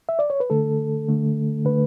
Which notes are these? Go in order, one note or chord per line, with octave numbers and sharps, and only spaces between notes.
E5
D5
C#5
B4
D3 A3 A4
D3 A3
D3 A3 B4